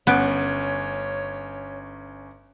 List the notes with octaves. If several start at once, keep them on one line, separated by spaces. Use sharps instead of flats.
G1 B3 C#4 C#5 D7